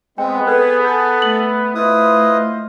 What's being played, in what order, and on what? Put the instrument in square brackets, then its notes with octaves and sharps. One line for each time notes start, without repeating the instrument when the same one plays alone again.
[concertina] G#3 C4 [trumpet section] B3 [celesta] G5 [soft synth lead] G#5
[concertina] G#4 [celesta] A4 B4 F#6
[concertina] A4 [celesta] G6
[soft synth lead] A3 [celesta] F#7
[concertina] E4 B4 D#6 [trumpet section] F4 C5 D#5